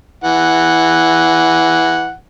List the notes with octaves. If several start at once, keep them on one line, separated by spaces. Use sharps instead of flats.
E3 F#5